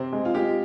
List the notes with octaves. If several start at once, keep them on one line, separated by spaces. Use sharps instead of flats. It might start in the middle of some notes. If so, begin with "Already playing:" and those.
Already playing: C3 C4
G#3
F4
G#3 G4